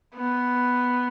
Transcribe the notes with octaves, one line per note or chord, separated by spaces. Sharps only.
B3